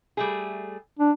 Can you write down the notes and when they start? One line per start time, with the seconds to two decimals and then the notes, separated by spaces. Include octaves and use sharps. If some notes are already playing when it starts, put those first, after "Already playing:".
0.17 G3 A3 G#4
0.99 D4